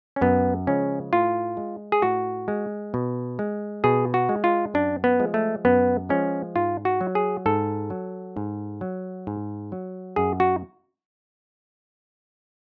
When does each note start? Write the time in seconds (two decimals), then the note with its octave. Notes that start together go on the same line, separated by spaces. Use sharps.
0.16 C#4
0.21 F#2 B3
0.67 C#3 F3 G#3 C#4
1.13 A2 F4
1.57 G#3
1.92 G#4
2.02 A2 F#4
2.48 G#3
2.94 B2
3.39 G#3
3.84 B2 G#4
4.14 F#4
4.29 G#3
4.44 F4
4.74 F#2 D4
5.04 B3
5.20 F3 G#3
5.34 A3
5.65 F#2 B3
6.09 F3 G#3 C#4
6.56 G#2 F4
6.85 F#4
7.01 F#3
7.15 G#4
7.46 G#2 A4
7.90 F#3
8.37 G#2
8.81 F#3
9.27 G#2
9.72 F#3
10.16 F#2 G#4
10.40 F#4